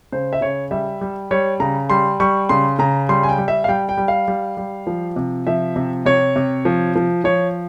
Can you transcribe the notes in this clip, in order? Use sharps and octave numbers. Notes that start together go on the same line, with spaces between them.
C#3 C5
E5
C#3 C#5
G3 E5
G3
G3 C#5
C#3 A#5
G3 C6
G3 C#6
C#3 C6
C#3 A#5
G3 C6
G#5
G5
G3
E5
F5
G3 G5
G5
G3
F5
G3
G3
F3
C3
F3 E5
C3
C3 C#5
C3
F3
F3
F3 C#5